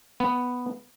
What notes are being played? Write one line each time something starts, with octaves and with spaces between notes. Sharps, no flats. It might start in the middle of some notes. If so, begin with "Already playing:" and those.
B3